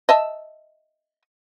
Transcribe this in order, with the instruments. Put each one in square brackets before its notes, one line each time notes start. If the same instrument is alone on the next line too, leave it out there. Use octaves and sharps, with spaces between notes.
[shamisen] D#5 E5 A5